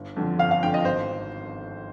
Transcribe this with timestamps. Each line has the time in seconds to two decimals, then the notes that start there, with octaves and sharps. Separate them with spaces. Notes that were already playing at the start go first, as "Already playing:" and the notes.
Already playing: G1
0.16 F2 D3 F3
0.39 G1 F5
0.51 F5
0.63 F2 D3 F3 G5
0.74 D#5
0.85 G#1 C5